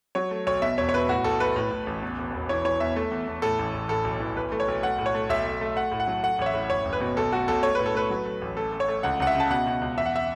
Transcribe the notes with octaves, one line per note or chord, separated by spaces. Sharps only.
F#3 C#5
A3
B1 C#5
B2 E5
E1 C#5
C#5
B2 B4
A2 F#4
B1 A4
A3 B4
A2
A2
A1
E2
E1
E1
E3 C#5
E3 C#5
E2 E5
A3
E2
E2
A2 A4
A1
A1
A2 A4
B1
E3
B1 B4
A3
C#5
B1
A3 F#5
A2
C#5
A3
B1 E5
A3
A3
A3 F#5
A2
F#5
F#3
A3 F#5
A1 C#5
E5
A2
F#1 C#5
F#1
B4
B2
B1 A4
A3 F#4
B1 A4
A3 C#5
A2 B4
A4
A3 B4
F#3
A3
A1
A3 A4
A3
C#5
A3
C#2 F#5
C#2 F#5
E5
C#3 A5
B2 F#5
B2
C#2
E2 E5
F#5
E5